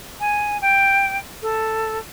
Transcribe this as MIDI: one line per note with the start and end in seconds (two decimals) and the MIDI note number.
0.20 0.57 80
0.61 1.17 79
1.42 1.98 69